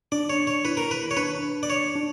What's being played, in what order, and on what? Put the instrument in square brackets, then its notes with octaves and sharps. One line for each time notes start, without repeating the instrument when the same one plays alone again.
[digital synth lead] D4 [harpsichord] D5
[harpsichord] C#5
C#5
[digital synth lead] E4 [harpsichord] B4
[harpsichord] A#4
B4
C#5
[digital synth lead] D4 [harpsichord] B4
[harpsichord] D5
C#5
[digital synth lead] D4